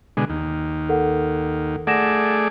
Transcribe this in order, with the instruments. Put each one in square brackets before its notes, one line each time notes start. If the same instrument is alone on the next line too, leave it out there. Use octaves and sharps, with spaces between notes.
[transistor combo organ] B2 D3 G#3
D#2
[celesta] A4 A#4 F#5
[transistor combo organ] A3 G#4 D5 [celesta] F#5 A#6 E7